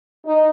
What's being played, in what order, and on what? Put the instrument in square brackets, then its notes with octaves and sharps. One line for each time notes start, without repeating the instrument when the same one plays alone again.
[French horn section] D#4